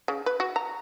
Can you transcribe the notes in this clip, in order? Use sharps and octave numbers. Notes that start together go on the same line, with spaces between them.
C#3
B4
F#4
A#5